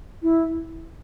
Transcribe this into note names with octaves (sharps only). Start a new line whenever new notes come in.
E4